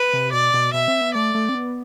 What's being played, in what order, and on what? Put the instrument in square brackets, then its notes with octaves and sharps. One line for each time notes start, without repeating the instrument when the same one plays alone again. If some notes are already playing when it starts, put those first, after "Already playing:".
Already playing: [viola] B4
[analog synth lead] C3
[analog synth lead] B2 [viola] D5
[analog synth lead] B2
[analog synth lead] B2 [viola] E5
[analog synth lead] C4
B3
[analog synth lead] A3 [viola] D5
[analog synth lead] A3
C4
B3